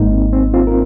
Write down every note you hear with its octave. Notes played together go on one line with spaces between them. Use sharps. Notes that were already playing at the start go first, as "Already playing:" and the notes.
Already playing: G#1 G#2 G#3 A#3 D#4
C4
C4
C4 F4
A#4